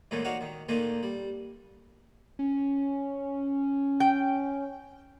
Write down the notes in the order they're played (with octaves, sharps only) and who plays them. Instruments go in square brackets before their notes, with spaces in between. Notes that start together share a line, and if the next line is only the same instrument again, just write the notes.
[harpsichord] C#2 A#2 D3 E3 A3 C#4
D#4 F#4 C#5 D5 F5
D#3
A#2 D#3 A3 A#3 D4 D#4
G3
[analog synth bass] C#4
[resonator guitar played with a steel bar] G5